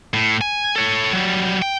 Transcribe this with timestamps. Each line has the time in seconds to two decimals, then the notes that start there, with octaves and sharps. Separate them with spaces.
0.14 A2
0.41 G#5
0.76 A4 C#5
1.13 F#3 G3
1.62 G5